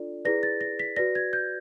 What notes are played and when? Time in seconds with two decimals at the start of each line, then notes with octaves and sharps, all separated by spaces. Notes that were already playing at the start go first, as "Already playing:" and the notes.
Already playing: D4 F4 A4 D5
0.25 E4 G#4 B4 D5 A#6
0.43 A6
0.61 A#6
0.79 B6
0.96 F#4 B4 D5 A#6
1.15 G#6
1.33 G6